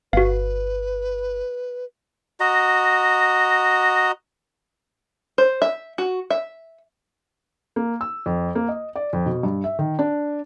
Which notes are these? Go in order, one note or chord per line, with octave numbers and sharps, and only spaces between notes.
G1 F#4 B4 F5
F#4 D#5 A#5
C5
E5
F#4
E5
A#3
E6
F2
A#3
D#5
D5
F2
B2
G2
E5
D#3
D4